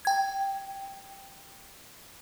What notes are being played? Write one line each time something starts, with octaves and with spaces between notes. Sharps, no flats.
G5 G#6